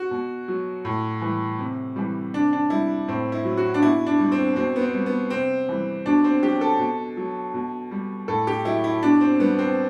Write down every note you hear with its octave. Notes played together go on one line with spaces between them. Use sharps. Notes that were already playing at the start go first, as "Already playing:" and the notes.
Already playing: F#4
B2
F#3
A2
E3 G3
C3
E3 G3
C3 D4
D4
G3 E4
A2 C4
E4
F#3
F#4
D4
B2 E4
D4
G3
C4
B2 C4
B3
C4
G3
B3
C3 C4
E3 G3
B2 D4
C4
F#3 G4
A4
B2
F#3
B2
G3
A2 A4
G4
F#3 E4
E4
B2 D4
C4
G3 B3
C4